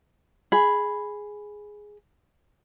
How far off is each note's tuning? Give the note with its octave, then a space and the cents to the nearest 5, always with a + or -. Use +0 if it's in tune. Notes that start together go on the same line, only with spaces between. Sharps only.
G#4 +0 B5 +0